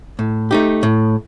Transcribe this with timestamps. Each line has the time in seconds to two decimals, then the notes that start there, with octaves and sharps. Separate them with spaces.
0.19 A2
0.51 A3 D#4 G4
0.83 A2